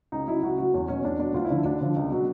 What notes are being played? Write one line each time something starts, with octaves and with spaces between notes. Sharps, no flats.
C#2 D#4
C#3 F#3 E4
C#2 F#4
C#3 F#3 F#4
E2 C#4
B2 F#3 C#4
E2 D4
B2 F#3 D4
D2 F4
E4
D3 F3
D2 D4
D3 F3
C#2
B2 F#3